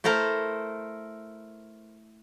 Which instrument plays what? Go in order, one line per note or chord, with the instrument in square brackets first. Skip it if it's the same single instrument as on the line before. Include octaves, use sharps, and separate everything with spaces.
[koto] A3 E4 A4 A#4 C5